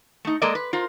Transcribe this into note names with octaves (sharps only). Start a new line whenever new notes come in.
A3 D#4
G#3 A#3 A4 A#4 D5 D#5
B4
F4 A#4 C5